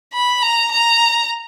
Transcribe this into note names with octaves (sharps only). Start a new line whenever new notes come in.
B5
A#5
A#5